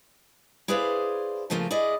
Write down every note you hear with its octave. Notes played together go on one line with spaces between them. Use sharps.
E4 G#4 B4 C5 D5 F5
C#3 F3 A3 A#3 F4
E4 G#4 D5 D#5